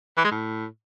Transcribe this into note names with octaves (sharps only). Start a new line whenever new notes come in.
E3
G#3
A2